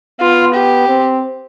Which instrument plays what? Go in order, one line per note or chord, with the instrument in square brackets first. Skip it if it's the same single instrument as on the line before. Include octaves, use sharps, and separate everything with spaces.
[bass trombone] B3 [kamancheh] F4
[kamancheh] G4
[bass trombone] C4